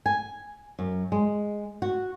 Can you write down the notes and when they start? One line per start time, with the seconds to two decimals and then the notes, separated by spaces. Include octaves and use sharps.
0.06 G#5
0.79 F#2
1.12 G#3
1.82 F#4